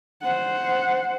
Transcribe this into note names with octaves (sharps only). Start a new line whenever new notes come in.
C5 F#5